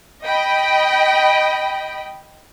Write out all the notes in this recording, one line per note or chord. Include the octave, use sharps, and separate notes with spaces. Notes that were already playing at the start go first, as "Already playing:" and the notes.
D#5 G5 B5